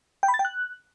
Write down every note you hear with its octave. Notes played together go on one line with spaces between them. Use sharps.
G5
B5
A6
G5
F#6